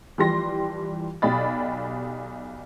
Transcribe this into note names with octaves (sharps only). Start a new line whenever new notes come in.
E3 F3 G3 G4 C6 A#6
B1 G4 D5 D#5 B5 A6